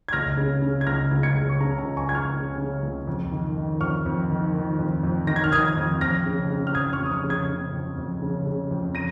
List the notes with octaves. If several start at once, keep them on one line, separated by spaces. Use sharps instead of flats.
G#6
C#2 F6 A#6
C#3
C#3
G#6
C#2 F6 A#6
C#2
G#6 C#7
C#3
C#6
C#3 A#5
A#5
C#2
G#5 C#6
C#2 G#6
C#6 F6
C#3
C#3
C#2
F2
D#3
D#3
F2 C#6 F6
F2
D#3
D#3
F2
F2
D#3 A#6
G#6
F6
D#3 D#6 G#6
F2
F2 F6 A#6
C#3
C#3
F6
F2 D#6 G#6
C#6 F6
F2
D#6
C#6 F6
C#3
D#6 G#6
C#3
F2
F2
C#3
C#3
F2
A#6 D#7